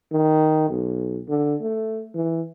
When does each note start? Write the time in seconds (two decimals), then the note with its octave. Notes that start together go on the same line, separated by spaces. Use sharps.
0.12 D#3
0.69 B1
1.28 D3
1.61 A3
2.15 E3